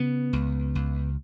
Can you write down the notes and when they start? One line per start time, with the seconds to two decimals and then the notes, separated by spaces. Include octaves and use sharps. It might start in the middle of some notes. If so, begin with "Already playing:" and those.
Already playing: C#3 B3
0.33 C#2
0.75 C#2